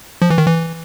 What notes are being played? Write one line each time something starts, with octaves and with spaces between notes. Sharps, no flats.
F3
E3
D#3
E3